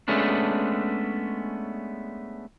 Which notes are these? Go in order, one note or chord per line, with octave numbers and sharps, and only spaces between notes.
G#3 A3 B3 C#4 D4